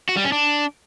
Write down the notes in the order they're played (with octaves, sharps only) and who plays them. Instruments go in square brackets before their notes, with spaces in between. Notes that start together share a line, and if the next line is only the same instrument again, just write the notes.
[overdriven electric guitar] F#4
G3
C#4
D4